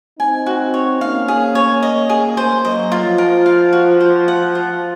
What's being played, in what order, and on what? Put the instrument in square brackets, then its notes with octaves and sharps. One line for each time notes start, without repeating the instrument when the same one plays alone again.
[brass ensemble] C4 D#4 [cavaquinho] G#5
[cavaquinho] F#4
C#5
[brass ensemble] A#3 C#4 [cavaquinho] F5
[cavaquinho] G#4
C#5
D#5
G#4
C5
[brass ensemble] F#3 A#3 [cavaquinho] D#5
[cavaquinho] F4
[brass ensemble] F3
[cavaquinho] A#4
F5
F#4
C5
F#5
F4